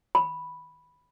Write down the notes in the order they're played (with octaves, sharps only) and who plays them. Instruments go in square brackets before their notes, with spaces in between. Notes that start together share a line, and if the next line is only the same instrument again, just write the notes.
[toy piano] B5